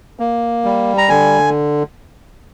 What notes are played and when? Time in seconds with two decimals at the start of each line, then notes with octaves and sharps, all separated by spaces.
0.19 A#3
0.65 G3
0.98 A#5
1.09 D3 G#5